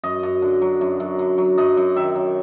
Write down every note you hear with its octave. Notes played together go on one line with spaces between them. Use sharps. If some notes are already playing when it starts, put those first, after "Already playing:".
F#2 D#5
F#2
D3
F#3
F#2
F#2
D3
F#3
F#2 D#5
F#2
D#3 E5
F#3